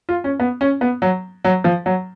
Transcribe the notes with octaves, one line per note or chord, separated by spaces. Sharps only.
F4
C#4
B3
C#4
B3
F#3
F#3
F3
F#3